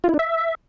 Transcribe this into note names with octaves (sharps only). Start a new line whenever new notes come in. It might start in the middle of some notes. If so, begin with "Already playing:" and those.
F4
E4
D4
E5